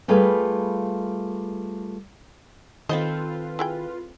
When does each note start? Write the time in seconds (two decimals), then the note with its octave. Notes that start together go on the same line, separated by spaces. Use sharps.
0.08 G3 A3 F4 G#4 B4 F5
2.89 D#3 C4 F4 A4 B4 C5 D#5
3.59 E4 G#4 G5